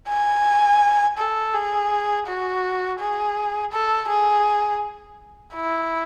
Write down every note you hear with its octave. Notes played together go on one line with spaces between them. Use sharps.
G#5
A4
G#4
F#4
G#4
A4
G#4
E4